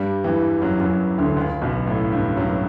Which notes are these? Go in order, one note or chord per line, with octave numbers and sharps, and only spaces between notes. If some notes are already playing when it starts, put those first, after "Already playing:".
Already playing: G2 G3
E2 E3
F#2 F#3
F#2 F#3
D2 D3
C#2 C#3
B1 B2
A2
G2
F#2 F#3